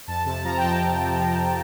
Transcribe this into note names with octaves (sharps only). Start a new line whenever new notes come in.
F2 A5
C3 A5
F3 A#5
G5
F2 A5
F2
C3
F3
F2